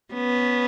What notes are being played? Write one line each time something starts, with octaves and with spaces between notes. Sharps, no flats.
B3 C#4